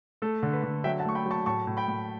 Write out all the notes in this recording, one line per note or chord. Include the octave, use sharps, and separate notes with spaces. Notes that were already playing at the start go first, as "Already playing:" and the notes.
A3 A4
D3
B4
D3
F#3 E5 G5
F#5 A5
A3 C#6
G5 B5
F#3
A5 C#6
A2 A5 C#6
A2
G5 B5
A2